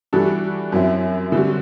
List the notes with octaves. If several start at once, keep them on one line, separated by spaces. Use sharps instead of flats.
E3 G3 D4 F#4 A4
F#2 F#3 C4 E4
D3 G3 C4 F#4